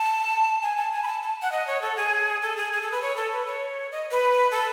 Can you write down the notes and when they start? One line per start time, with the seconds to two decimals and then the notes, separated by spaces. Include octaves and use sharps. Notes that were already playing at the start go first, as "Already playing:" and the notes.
Already playing: A5
0.62 G#5
0.77 A5
0.92 G#5
1.03 B5
1.07 A5
1.22 A5
1.42 F#5
1.52 D#5
1.67 C#5
1.82 A4
1.97 G#4
2.42 A4
2.57 G#4
2.72 G#4
2.82 A4
2.92 B4
3.02 C#5
3.16 A4
3.31 B4
3.47 C#5
3.92 D#5
4.11 B4
4.51 A4